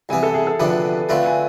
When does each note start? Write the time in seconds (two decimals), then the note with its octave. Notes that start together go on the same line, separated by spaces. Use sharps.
0.09 C2 C3 E3 B3 G#5
0.23 A4
0.34 G#4
0.47 A4
0.59 D2 C3 F3 B3 D4 B4
1.09 D3 A3 C4 F4 B4
1.26 G#5